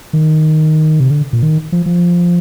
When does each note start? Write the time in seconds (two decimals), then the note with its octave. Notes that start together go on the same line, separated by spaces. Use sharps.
0.13 D#3
1.00 C3
1.11 D3
1.33 A#2
1.43 D#3
1.72 F3
1.86 F3